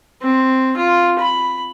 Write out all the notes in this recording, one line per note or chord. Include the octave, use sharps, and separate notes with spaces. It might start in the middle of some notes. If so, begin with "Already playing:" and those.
C4
F4
B5